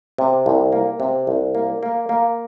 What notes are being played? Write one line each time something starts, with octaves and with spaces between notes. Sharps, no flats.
C3
C2
A#3
C3
C2
A#3
A#3
A#3